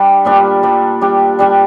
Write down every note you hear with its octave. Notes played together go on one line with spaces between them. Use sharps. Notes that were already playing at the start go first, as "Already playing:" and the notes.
Already playing: G3 D4 G4
A#2 G3 D4 G4
G3 D4 G4
G3 D4 G4
G3 D4 G4